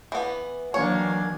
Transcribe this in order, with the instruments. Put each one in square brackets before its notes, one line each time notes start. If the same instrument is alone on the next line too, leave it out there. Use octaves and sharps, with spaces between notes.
[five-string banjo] E3 B3
[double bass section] D#3 E3 F#3 [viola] A#3 D4 [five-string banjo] C#5 [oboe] G#5